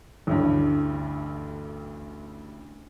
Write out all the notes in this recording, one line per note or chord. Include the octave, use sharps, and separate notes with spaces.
A1 D2 G2